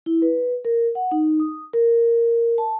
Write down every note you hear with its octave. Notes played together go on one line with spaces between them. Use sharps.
E4
B4
A#4
F#5
D#4
D#6
A#4
A5